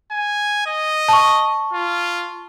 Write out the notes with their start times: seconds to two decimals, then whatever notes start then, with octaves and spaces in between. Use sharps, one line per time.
0.11 G#5
0.66 D#5
1.09 A5 C#6
1.73 F4